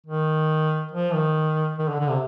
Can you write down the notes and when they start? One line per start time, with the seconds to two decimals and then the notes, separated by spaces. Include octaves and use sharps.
0.07 D#3
0.92 F3
1.13 D#3
1.78 D#3
1.89 D3
1.99 D3
2.09 C3